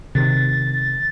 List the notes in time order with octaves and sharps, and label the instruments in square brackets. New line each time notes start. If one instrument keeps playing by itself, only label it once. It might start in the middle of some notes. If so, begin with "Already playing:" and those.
[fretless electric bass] C3 D#3 [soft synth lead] A6